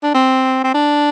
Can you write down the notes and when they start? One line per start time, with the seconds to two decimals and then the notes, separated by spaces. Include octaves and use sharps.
0.03 D4
0.14 C4
0.64 C4
0.74 D4